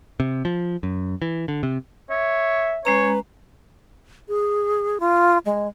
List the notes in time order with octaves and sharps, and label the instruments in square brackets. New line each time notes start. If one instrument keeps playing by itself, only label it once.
[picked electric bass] C3
F3
F#2
E3
D3
C3
[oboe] C#5 [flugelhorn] E5
[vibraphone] G#3 C#4 A#5 [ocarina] B4 [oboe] C#5
[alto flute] G#4
F4
G#3